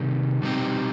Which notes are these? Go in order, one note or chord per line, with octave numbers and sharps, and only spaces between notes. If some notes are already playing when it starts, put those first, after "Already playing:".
Already playing: C3 D#3 G3 D#4
B2 G3 C4 D#4 G4